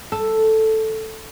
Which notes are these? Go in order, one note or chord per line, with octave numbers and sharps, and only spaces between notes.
A4